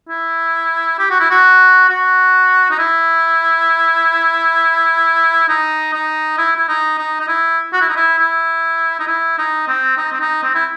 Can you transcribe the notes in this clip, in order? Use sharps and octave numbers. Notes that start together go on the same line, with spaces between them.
E4
G4
F#4
E4
F#4
F#4
D#4
E4
D#4
D#4
E4
E4
D#4
D#4
D#4
E4
F#4
E4
D#4
E4
E4
D#4
E4
D#4
C4
D#4
C4
D#4
C4
E4